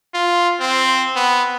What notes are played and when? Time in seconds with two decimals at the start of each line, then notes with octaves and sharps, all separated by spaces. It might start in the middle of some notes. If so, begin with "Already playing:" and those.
0.14 F4
0.61 C4
1.16 B3